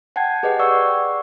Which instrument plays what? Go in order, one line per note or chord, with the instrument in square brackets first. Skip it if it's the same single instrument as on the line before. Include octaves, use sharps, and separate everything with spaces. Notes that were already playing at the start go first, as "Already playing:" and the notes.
[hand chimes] F#5 G5 A5 G#6
G4 G#4 B4 D#5 F#5 G5
D5 F#5 C#6 E6